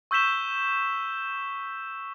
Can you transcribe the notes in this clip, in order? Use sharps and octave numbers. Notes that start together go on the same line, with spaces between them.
C#6 E6 G6 B6 E7 G7